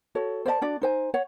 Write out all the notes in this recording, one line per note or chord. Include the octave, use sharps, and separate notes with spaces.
F#4 A4 C#5
C5 D5 D#5 A5
D4 F#4 D5
D#4 C5 G#5
C#5 F#5